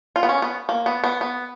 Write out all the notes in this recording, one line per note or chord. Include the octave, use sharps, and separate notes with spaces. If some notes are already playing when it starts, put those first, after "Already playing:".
F4
B3
C#4
B3
A#3
B3
B3
B3